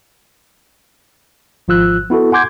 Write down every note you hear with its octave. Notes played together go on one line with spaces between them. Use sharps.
G#1 F3 F4 E6 F#6
B3 E4 F#4 A4
F#5 G#5 C6 D6 G6 G#6